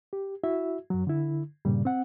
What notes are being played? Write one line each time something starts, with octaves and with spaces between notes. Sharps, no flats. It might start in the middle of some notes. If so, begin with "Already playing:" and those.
G4
E4 F#4 E5
F#2 F#3
D3 E4
G2 A#2 C#3 G3
C4 F#5